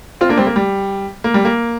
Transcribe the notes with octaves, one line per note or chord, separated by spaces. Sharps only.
C4 F4
A#3 D4
G3 C4
A#3
G3
A#3
G3
A#3